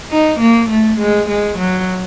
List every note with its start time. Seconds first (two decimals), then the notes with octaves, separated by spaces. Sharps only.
0.10 D#4
0.40 A#3
0.70 A3
0.99 G#3
1.29 G#3
1.58 F#3